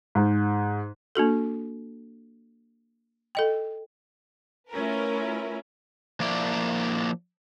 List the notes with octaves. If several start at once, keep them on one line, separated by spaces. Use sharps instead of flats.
G#2
A#3 D4 F#4 A4
A4 D#5 G5
A3 C#4 E4 F4 A#4 B4
F3 A#3 D4 E4 D5